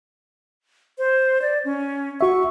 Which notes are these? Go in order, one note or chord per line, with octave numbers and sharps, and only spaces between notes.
C5
D5
C#4
F#4 E5 C#6